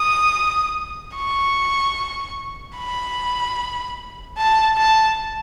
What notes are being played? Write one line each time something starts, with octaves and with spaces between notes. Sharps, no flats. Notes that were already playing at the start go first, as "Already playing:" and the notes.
Already playing: D#6
C#6
B5
A5
A5